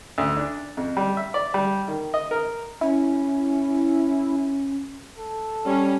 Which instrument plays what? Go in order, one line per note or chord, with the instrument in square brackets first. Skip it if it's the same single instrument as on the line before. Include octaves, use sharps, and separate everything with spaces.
[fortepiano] D2
D4
F2
G3
E5
D5
G3
D#3
D#5
A#4
[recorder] C#4 [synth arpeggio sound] E4
[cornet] A4
[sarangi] G3 [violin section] C#4